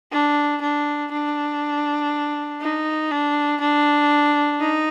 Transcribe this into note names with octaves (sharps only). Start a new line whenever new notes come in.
D4
D4
D4
D#4
D4
D4
D#4